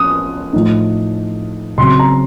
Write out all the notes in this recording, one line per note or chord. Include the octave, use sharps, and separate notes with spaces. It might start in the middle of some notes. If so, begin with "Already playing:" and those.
Already playing: F3 C#4 D#6
A2 F3 A3 D#4
C#3 F#3 C4 C6
A#5